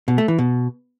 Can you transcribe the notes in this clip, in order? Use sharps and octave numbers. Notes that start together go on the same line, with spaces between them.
B2
A3
E3
B2